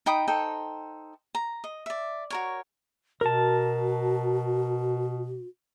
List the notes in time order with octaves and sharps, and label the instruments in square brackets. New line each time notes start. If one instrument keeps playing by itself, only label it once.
[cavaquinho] D#4 G5 B5 D#6
D#4 A4 C5 G5
A#5
D#5
D5 E5
F#4 A#4 C#5
[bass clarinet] B2 [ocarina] F#4 [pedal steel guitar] A#4 A5